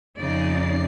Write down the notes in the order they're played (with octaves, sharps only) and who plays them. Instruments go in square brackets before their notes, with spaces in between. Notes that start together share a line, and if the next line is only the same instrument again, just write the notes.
[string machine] F2 C7 [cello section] C#3 D#4 D5